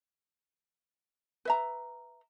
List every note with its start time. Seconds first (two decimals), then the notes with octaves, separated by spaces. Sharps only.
1.45 B4 E5 A#5